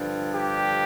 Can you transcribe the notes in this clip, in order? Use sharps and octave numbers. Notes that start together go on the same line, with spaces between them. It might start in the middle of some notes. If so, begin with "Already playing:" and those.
Already playing: G2 D3 F3
G4